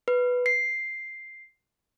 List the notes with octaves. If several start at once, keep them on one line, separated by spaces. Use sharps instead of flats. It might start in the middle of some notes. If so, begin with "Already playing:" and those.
B4
C7